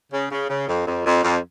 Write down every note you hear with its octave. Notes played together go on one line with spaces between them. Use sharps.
C#3
C#3
C#3
F2
F2
F2
F2